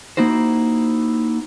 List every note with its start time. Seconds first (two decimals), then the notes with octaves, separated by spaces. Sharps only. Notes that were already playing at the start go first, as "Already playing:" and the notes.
0.17 A#3 D#4 E4 F#4 C5